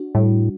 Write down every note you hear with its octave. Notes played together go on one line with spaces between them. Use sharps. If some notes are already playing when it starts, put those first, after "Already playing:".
Already playing: D4 F#4
A2 G3